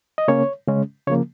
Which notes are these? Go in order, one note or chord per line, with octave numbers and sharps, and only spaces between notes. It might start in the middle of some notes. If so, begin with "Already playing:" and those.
D#5
C#3 A#3 C#4 C#5
C#3 G#3 C#4
C#3 F3 A#3 C#5